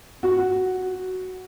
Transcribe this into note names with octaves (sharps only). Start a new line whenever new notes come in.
F#4